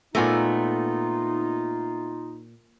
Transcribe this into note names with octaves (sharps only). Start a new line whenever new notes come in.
A#2 A3 B3 D#4 F4 G#4 D#5